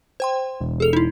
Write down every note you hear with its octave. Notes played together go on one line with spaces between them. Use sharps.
C5 G5 C6
E1
G#4 A4 F7
D#4 E4